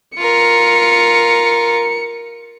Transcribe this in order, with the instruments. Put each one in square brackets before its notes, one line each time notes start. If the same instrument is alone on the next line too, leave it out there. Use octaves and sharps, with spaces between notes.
[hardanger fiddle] F4 A#4 [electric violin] C#7